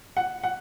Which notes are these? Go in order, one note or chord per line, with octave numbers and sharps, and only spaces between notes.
F#5
F#5